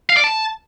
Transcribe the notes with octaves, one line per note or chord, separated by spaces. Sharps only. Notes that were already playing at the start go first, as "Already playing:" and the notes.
F5
D5
A5